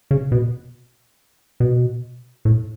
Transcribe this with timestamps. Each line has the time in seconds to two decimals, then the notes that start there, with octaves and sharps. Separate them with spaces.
0.11 C#3
0.32 B2
1.60 B2
2.45 A2